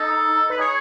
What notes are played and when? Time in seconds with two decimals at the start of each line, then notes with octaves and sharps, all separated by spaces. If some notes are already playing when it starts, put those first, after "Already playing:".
Already playing: D#4 A4
0.50 B4
0.59 G#4 C#5